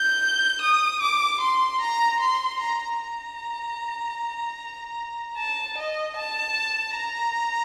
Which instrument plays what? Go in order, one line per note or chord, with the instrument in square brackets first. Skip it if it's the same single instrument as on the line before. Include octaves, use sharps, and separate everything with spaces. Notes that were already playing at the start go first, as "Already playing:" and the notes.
Already playing: [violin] G6
D#6
D6
C6
A#5
C6
A#5
A#5
A5
D#5
A5
A#5